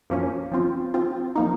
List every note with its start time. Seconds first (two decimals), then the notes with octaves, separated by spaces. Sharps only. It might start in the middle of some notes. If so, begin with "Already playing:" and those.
0.10 F#2 F3 A#3 C#4
0.52 F3 C4 F4
0.94 F3 C4 F4
1.36 F3 A#3 D#4